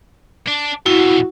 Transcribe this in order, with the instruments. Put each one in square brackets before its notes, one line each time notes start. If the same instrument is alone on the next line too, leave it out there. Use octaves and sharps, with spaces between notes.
[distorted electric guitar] D4
[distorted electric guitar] F2 B2 [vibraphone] E4 [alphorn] F#4